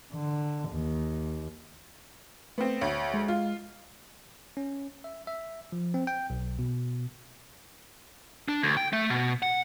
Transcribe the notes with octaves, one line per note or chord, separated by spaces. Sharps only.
D3
D#2
A3 B3 C4
D2 C#5
G#3
F4
C#4
E5
E5
F3
C4
G5
B1
B2
D4
D2
G5
A3
B2
F#5